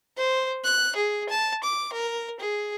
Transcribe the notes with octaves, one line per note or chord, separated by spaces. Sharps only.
C5
F#6
G#4
A5
D6
A#4
G#4